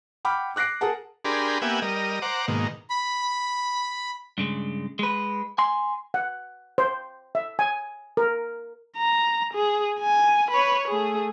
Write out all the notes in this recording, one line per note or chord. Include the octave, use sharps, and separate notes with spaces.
F#5 G5 B5 D6 F6
D6 F#6 A#6 C7 D7
G#4 A#4 F#5 A5
D4 G4 G#4 A#4 B5 C6
A#3 B3 G4 E5 F#5 G#5
G3 A#4 D#5
C5 F#5 A#5 D6
G#2 B2 D#3 A#3
B5
G2 C#3 G#3
G#3 B4
G#5 C6
F#5
C5
E5
G#5
A#4
A#5
G#4
G#5
B4 C#5
A3 G#4